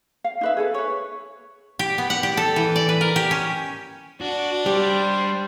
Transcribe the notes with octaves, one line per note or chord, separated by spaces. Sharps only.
F5
D#4 B4 E5
G#4 A4 B4
B4 C#5
G4
B3
F#5
G4
A4
E3
D5
B4
A#4
G4
C#4
D4 F#4
G3 G4 C5